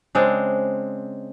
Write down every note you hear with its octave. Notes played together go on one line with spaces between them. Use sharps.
C#3 G#3 C4 D4